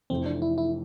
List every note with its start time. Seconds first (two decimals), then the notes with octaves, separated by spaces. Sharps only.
0.10 F1 F2 E3 C4
0.26 D4
0.42 E4
0.58 E4